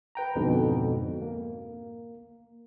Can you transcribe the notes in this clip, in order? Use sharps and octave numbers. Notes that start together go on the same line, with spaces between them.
B4 G5 A#5
F2 G#2 B2 D3
A#3